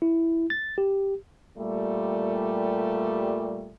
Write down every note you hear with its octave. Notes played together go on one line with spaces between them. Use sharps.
E4
A6
G4
A#2 G3 A3